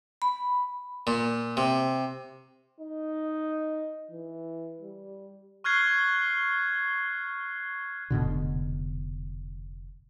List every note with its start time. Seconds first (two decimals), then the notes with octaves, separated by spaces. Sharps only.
0.22 B5
1.07 A#2
1.57 C3
2.80 D#4
4.11 E3
4.81 G3
5.64 C#6 F6 F#6 G#6 C7 G7
8.10 F1 G#2 B2 D3